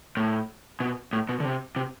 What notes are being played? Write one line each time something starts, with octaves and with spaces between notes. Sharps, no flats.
A2
B2
A2
B2
D3
C3
C3